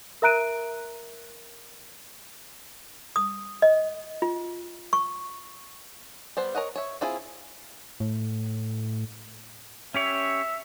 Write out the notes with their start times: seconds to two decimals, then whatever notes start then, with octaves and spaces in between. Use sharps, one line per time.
0.22 A#4 E5 A#5 F#6 D7 D#7
3.16 D#6
3.62 D#5
4.22 F4
4.93 C#6
6.37 G3 B3 C5
6.55 A#4 C#5 D#5 F#5
6.76 C#5 E5
7.01 C4 E4 F4 G#4
8.00 A2
9.94 C#4 G4 C#5 E5